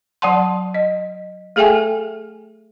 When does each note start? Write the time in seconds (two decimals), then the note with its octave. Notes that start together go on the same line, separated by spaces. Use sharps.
0.22 F#3 D5 F#5 A5 C6
0.74 D#5
1.56 A3 G#4 A4 E5 G5 G#5